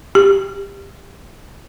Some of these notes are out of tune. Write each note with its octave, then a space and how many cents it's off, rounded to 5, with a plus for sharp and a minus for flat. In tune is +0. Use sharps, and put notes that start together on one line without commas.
G4 +15